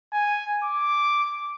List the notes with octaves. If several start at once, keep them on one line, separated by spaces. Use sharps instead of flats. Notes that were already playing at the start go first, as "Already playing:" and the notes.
G#5
D6